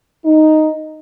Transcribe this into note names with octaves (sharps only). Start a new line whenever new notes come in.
D#4